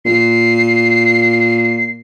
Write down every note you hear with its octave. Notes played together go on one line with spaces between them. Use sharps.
A#2 C7